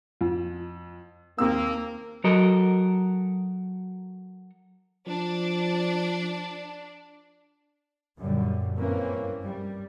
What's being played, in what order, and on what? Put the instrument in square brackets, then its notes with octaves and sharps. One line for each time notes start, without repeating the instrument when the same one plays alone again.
[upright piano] F2
[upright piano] D#2 C4 E6 [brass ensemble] A#3
[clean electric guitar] F#3 F#4 A4 A#4 D#5
[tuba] F3 [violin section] D4
[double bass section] F#2 A#2 D3 G3
G2 E3 A#3 C4 C#4
G3